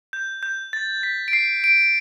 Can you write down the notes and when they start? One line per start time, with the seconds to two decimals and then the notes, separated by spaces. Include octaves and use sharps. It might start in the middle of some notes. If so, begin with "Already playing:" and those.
0.13 G6
0.43 G6
0.73 A6
1.03 B6
1.28 D7
1.33 C7
1.64 D7